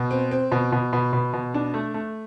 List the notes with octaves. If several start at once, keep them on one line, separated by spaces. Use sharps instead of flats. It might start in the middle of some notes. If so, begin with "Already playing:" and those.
Already playing: B2
C4
C4
B2
B2
B2
B2
B2
D4
A3
A3